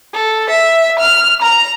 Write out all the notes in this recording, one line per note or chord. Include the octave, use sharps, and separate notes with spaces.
A4
E5
F6
A#5 F7